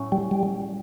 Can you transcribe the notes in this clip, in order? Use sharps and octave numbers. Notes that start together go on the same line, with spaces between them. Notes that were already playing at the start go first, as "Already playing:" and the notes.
Already playing: A2 F#3 A3 C#4 E4
G3
G3